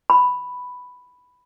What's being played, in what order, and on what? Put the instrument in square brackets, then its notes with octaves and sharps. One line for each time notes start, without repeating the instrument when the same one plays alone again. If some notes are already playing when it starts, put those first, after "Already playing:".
[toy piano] B5